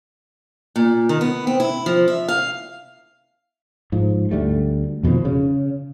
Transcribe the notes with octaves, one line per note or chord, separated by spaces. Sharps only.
A#2
D#3
B3
C4
E4
F3
E5
F5
G#2 F3
D2 G3 A3
F2 B2 D#3 F3
C#3